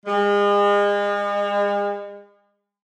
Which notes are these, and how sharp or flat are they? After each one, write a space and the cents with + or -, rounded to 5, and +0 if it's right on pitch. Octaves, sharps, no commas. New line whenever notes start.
G#3 -40